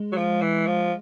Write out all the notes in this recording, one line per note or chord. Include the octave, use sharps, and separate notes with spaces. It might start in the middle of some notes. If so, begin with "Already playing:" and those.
Already playing: G#3
F#3
F3
E3
F3